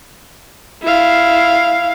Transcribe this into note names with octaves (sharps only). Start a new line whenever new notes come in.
E4 F5